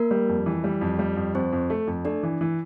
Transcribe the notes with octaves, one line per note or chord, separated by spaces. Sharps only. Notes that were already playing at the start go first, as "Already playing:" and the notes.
Already playing: A#3 A#4
G3
F2
E3
G3
F2
G3
F2
F2 C4 C5
F2
A3
F2
A3 D4 D5
E3
E3